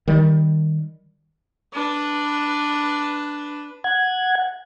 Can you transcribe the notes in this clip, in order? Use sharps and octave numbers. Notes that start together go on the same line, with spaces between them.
D#3 G3
D4 B4
F#5 G#6